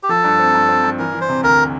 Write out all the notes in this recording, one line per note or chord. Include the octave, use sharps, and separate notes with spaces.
G4
F3 A4
G2
C4
G2
C4
G2
E3 A#4
E3
C5
C3
D2 A#4